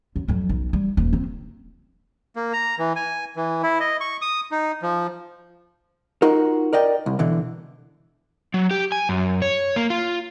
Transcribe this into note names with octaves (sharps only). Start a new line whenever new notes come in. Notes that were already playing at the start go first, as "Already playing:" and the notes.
F#2
F2 F#3
B1
G3
D#1
C4 F4
A#3
A#5
E3
G#5
E3
E4
D#5
C#6
D#6
D#4
F3
D#4 F4 F#4 A#4
A#4 D5 D#5 G5
C2
B2 D3 E3
F#3
G4
G#5
F#2
C#5
A#3
F4